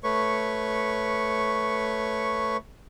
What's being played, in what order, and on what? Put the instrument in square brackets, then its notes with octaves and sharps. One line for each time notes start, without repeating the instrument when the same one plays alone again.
[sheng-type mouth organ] A3 B4 C#5 C#6